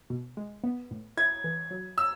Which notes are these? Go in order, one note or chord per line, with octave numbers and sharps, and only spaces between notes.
B2
G#3
B3
A2
E4 G#6
E3
F#3
E6